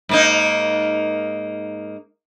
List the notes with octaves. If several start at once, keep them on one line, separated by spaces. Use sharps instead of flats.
G#2 A#3 D#4